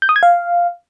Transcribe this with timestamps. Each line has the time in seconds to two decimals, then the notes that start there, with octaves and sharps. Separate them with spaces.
0.02 G6
0.09 D#6
0.16 G#6
0.23 F5